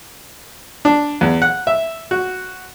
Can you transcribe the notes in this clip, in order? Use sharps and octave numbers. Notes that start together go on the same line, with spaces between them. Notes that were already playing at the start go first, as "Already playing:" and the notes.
D4
E2
F#5
E5
F#4